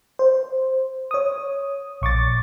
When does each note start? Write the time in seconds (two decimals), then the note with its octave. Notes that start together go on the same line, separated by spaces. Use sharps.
0.19 C5
1.11 C#5 D#6
2.02 A#1 C#6 D6 A6